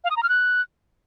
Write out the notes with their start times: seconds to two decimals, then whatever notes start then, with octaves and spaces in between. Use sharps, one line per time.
0.04 F5
0.10 D#6
0.16 A#5
0.23 F6
0.29 F#6